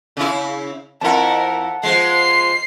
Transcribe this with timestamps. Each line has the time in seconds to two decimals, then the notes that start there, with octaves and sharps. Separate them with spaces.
0.17 C#3 E4
1.01 F2 E4 A#4 F#5 A5
1.83 F3 G#3 C7